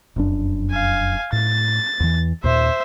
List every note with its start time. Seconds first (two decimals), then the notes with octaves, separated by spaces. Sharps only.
0.16 F1 F#2 D4
0.71 F5 G#5
1.32 A2 A6
2.00 E2 E3
2.44 D#2 A#2 C5 E5